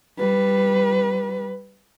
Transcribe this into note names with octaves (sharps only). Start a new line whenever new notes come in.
G3 B4